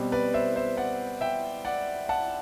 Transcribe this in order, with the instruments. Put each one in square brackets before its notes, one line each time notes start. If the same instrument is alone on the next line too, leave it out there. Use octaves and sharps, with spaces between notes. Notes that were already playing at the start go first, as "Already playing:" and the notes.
Already playing: [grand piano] B2 G3 C4
B4 D5
C5 E5
C5 E5
D5 F#5
E5 G5
D5 F#5
F#5 A5